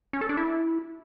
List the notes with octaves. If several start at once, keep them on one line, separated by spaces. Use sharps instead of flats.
C#4
A4
D4
E4